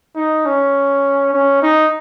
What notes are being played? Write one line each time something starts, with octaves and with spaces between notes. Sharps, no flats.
D#4
C#4
C#4
D#4